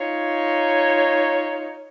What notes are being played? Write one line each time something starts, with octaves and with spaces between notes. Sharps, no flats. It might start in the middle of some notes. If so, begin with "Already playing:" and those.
D#4 F4 C#5